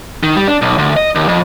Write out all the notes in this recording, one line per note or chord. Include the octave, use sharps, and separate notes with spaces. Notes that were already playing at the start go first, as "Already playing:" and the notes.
D#3
G3
D4
B1
D2
D#5
D#2
F2